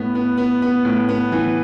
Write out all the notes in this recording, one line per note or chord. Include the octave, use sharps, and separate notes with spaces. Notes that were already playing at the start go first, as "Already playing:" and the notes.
Already playing: A2 B3
B3
B3
B3
A2
B3
E3